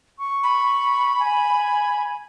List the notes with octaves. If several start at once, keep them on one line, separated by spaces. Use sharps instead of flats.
C#6
B5
G#5